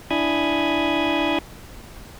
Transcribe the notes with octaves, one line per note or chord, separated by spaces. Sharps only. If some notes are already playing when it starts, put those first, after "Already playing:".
D4 E4 G#5 B5 D#6 G#6